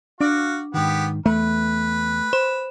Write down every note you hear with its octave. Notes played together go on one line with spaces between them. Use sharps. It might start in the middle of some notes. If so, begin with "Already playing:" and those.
D4 F#4 F5 D6
G#2 D#3 B3 G4
E2 A3 B4
C5 E7